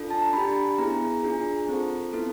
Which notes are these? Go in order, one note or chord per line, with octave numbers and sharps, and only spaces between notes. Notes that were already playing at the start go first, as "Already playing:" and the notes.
Already playing: D4 F4 A4
A5
A#5
D4 G4 B5
B3 E4 G#4 A#5
D4 F4 G#4
C4 F4 A4
B3 E4 A4